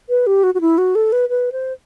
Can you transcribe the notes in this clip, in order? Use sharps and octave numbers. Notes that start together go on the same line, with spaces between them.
B4
G4
F#4
F#4
E4
F#4
A4
B4
B4
C5